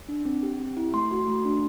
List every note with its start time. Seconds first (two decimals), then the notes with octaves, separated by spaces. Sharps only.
0.09 D4
0.25 C4
0.43 G4
0.60 C4
0.77 E4
0.94 A3 C6
1.11 F#4
1.27 A3
1.45 D4